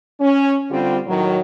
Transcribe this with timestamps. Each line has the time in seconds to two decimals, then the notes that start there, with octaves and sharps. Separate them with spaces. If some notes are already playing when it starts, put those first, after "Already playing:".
0.21 C#4
0.71 D3 G3 C4 F4 G4
1.07 A2 D#3 F#3